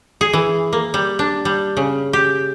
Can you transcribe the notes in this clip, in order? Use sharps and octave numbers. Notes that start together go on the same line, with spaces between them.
G#4
E3
A#3
G3
D4
G3
C#3
G4